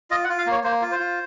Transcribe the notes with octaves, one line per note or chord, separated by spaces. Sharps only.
F4 D#5
F#5
F4
F5
A#3 C#5
A#3 C5
F4
C5
F4